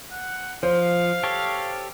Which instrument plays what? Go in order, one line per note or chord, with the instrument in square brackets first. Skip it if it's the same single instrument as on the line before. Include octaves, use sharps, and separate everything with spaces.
[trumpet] F#5
[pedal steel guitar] F3 [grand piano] C5 [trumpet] F5
[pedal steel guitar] G4 A4 C#5